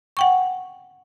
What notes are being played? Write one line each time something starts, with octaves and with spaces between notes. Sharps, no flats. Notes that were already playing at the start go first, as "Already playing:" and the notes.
F#5 G5 C#6